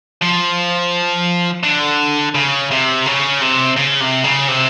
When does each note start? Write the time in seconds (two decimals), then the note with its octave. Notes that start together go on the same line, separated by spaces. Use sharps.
0.22 F3
1.64 D3
2.35 C#3
2.71 C3
3.06 C#3
3.41 C3
3.76 C#3
4.00 C3
4.24 C#3
4.48 C3